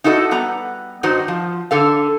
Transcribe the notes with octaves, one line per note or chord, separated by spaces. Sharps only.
D#4 E4 F#4 A4 B4 D#5
G3 B3 A#5
G2 D#3 D#4 F#4 C5
F3
D3 A4 F5